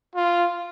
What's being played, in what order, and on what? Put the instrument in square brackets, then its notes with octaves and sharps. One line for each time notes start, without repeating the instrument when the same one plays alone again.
[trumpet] F4